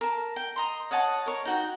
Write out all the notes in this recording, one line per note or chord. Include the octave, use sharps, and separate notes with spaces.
A#4 A5
G5
D#5 A#5 C6
C#5 D#5 F#5 A5
A#4 C#5
D#4 F#4 G5